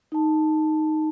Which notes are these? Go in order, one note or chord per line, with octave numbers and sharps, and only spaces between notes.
D#4 A5